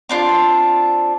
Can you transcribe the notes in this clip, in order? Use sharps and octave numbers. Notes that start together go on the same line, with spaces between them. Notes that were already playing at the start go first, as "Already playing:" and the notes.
C4 D4 F4